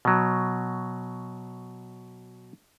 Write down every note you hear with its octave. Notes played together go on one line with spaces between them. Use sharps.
B2 F#3